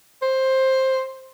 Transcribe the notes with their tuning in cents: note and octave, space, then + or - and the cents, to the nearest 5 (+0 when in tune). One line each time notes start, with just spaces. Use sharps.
C5 +10